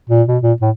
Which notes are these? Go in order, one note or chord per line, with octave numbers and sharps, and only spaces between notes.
A#2
B2
A#2
A2